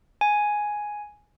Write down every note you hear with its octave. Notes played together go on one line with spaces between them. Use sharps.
G#5